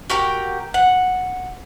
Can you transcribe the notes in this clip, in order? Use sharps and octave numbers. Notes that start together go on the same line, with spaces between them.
F#4 G4 A#4 G5
F#5